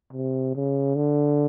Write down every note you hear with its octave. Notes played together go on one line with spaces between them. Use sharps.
C3
C#3
D3